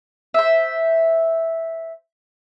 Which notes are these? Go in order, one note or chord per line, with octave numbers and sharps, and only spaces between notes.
C5 E5